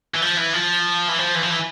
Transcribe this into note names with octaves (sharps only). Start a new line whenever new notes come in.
E3
F3
E3
F3
E3
F3
E3
F3
E3